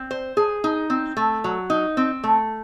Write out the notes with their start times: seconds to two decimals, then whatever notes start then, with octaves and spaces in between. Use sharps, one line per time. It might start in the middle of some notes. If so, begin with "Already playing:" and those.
Already playing: C4
0.11 C5
0.37 G#4
0.64 D#4
0.90 C4
1.17 A3
1.44 F#3
1.70 D#4
1.97 C4
2.24 A3